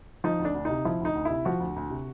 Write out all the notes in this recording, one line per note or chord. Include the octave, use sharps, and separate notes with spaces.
F3 D#4
D2
D4
D2
C3 D#4
F3 E4
D2 D#4
D2
C3 E4
F3 F#4
D2
D2
C3